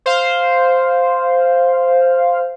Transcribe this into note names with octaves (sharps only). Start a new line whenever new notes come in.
C5 F5